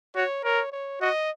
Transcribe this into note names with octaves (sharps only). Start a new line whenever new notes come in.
F#4 C#5
A#4 C#5
C#5
F#4 D#5